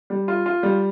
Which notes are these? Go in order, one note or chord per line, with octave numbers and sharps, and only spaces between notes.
G3
F4
F4
G3